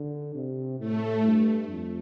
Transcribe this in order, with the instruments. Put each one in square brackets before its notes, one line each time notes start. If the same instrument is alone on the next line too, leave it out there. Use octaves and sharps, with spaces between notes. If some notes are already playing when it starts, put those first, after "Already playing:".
Already playing: [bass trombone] D3
C3
[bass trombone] A2 [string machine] A3
[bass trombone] G2
F2